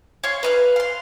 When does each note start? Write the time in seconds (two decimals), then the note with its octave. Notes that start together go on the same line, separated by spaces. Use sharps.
0.24 C#5 F5 C6
0.43 B4 D#5 F5
0.76 F5 C6